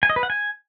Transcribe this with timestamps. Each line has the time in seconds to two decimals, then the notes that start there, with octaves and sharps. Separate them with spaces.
0.03 G#5
0.10 D#5
0.16 B4
0.23 F#5
0.30 G#5